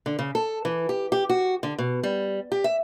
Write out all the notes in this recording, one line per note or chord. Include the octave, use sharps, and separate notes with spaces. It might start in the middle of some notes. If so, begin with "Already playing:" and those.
D3
C#3
A4
E3
G4
G4
F#4
D3
B2
G3
G4
E5